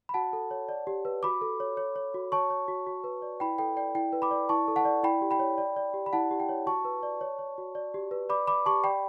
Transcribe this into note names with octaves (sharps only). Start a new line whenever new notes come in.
B5
F#4 F#5 A5
A4
C#5
D5
G4
B4
F#4 B5 D6
A4
C#5
C#5
C#5
F#4
C#5 A5 C#6
C#5
F#4
F#4
B4
D5
E4 G5 B5
A4 G5
D5 G5
E4 G5
B4
B5 D6
D5
E4 A5 C#6
A4
F#5 A5
D5
E4 G5 B5
G4
G5 B5
C#5
D5
D5
G4
B5
E4 F#5 A5
G4
G5
C#5
F#4 A5 C#6
B4
D5
C#5
C#5
F#4
D5
G4
B4
D5 B5 D6
D5 B5 D6
G4 A5 C#6
D5 G5 B5